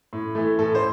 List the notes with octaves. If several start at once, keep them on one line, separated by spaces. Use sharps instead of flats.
A2
E3 A3
A2 A4
C5